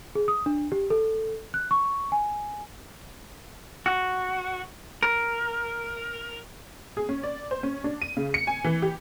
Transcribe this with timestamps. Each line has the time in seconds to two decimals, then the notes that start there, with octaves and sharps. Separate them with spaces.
0.15 G#4
0.28 D#6
0.46 D4
0.72 G4
0.90 A4
1.54 F#6
1.71 C#6
2.12 G#5
3.86 F#4
5.03 A#4
6.97 G#4
7.09 C#4
7.23 D5
7.51 C5
7.63 C#4
7.84 D4
8.02 D#7
8.17 C#3
8.34 C#7
8.47 G#5
8.64 E3
8.82 G4